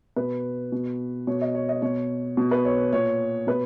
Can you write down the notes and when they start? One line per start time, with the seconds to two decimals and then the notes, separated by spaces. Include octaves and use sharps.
0.16 B2 B4
0.72 B2
1.27 B2 C#5
1.41 D#5
1.55 C#5
1.69 D#5
1.82 B2 C#5
2.37 B2
2.51 B4
2.65 C#5
2.93 A#2 C#5
3.47 B2 B4